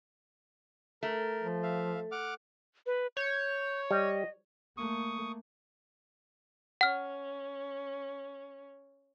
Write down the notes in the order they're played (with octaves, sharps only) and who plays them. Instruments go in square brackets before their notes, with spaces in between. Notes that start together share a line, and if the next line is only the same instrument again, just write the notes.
[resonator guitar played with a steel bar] A3 [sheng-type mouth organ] A#4
[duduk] F3
[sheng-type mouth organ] E5 F5
F#5 D6 F6
[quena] B4
[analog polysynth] C#5 [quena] G6
[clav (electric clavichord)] G3 [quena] D#5
[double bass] A3 A#3 [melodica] C#6 D#6
[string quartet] C#4 [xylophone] F#5 F6